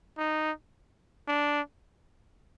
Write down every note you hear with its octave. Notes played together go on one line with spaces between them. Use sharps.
D#4
D4